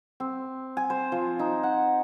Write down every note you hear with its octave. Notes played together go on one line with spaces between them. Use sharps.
C4
G#5
C5
F3
D#4
F#5